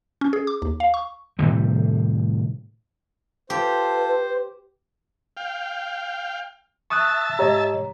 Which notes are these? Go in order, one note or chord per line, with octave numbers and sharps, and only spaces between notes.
C#4
G#4
D6
D#2
F5
C#6
A2 C3 D#3 G3
F4 G4 A4 B4 C5
F5 G5
E5 A5 C#6 D#6 F#6
G#2 G4 C#5 D#5 A#5